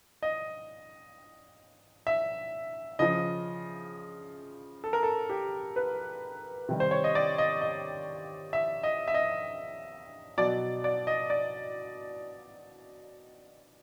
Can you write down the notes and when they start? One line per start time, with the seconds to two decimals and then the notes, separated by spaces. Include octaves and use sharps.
0.23 D#5
2.07 E5
2.99 C#3 F3 D#5
4.84 A4
4.93 A#4
5.03 A4
5.29 G4
5.76 B4
6.69 C3 D#3 G3
6.80 C5
6.91 C#5
7.04 D#5
7.15 D5
7.38 D#5
7.61 D#5
8.53 E5
8.83 D#5
9.08 E5
9.14 D#5
10.38 B2 F#3 D5
10.84 D5
11.07 D#5
11.30 D5